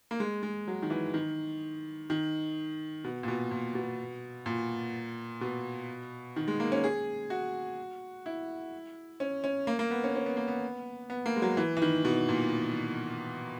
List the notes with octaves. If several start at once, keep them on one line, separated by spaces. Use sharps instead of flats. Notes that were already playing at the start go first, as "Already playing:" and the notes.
A#3
G#3
G#3
F#3
D#3
E3
D#3
D#3
B2
A#2
B2
A#2
B2
A#2
B2
D#3
G#3
A#3
C#4
G#4
F#4
E4
C#4
C#4
A#3
A#3
B3
C#4
C#4
B3
A#3
B3
B3
A#3
G#3
F#3
E3
E3
D#3
B2
A#2